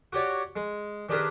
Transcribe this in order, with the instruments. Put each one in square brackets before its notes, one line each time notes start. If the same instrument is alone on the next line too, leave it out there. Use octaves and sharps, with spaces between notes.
[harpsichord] F#4 G4 C#5 D5
G#3
D#3 D4 G4 G#4 A#4 B4